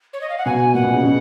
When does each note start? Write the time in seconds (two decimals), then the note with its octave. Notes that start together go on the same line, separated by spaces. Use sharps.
0.13 C#5
0.21 D#5
0.29 F5
0.38 F#5
0.46 B2 G#5
0.74 A#2 F#5
0.84 B2
0.94 C#3
1.04 B2